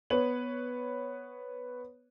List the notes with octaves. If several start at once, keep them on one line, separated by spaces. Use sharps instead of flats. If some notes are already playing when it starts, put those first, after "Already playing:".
B3 B4 C#5 F#7